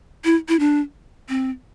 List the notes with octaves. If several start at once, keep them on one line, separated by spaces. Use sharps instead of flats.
E4
E4
D4
C4